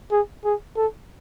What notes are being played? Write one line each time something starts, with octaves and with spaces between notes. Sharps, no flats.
G#4
G#4
A4